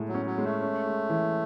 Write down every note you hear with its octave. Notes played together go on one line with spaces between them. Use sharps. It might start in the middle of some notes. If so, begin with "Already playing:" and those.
Already playing: A2 G#3 G#4
F#3
C#4
F#3
G#3
A3
C#4
G#3
E3